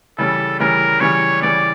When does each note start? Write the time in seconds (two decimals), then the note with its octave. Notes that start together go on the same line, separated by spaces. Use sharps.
0.18 C#3 E3 G3 A4
0.60 C#3 E3 G3 A#4
1.01 C#3 E3 G3 C#5
1.42 C#3 E3 G3 D5